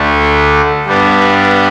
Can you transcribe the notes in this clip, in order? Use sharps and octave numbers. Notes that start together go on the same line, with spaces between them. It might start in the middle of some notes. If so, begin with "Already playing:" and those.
Already playing: D2 D3 A3
G2 G3 B3 D4